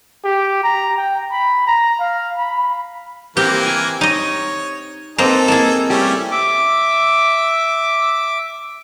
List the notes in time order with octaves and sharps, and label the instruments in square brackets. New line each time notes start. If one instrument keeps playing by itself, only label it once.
[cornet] G4
A#5
G5
B5
A#5
F5
B5
[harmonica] E3 A#3 A#4 [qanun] C4 [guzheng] G4
[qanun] G#5
[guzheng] D#4 D#5 [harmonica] C#5
[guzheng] A#3 C4 [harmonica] D#4 A4 [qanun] B4 A#5
[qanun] A#3 E4 [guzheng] G#4 A5
[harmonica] G3 A3 C#4 [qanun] G4
[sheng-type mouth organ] E5 D6